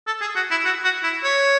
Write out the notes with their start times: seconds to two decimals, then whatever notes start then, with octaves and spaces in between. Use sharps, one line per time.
0.07 A4
0.21 G#4
0.36 F#4
0.51 E4
0.65 F#4
0.84 F#4
1.04 E4
1.24 C#5